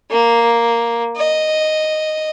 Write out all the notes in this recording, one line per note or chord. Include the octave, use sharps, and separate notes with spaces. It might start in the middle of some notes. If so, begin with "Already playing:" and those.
A#3
D#5